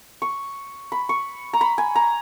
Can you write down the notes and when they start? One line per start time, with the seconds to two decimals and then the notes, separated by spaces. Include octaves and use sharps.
0.22 C#6
0.92 B5
1.09 C#6
1.53 A#5
1.61 B5
1.78 G#5
1.95 A#5